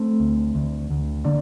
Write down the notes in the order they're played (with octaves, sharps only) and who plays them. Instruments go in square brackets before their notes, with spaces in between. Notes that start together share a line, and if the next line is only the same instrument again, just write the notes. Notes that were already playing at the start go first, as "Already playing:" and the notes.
Already playing: [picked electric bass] A3 C4
D2
D2
D2
D3 A#3 D4